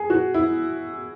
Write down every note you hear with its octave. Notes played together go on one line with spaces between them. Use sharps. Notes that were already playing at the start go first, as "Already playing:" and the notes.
Already playing: G#4
F#4
E4